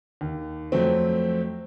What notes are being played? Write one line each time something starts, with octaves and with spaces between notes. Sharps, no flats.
D#2
F2 F#3 A3 C4